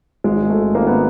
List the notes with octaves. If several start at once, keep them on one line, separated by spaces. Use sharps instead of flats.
G#1 G#3
G#1 A3
G#1 A#3
B3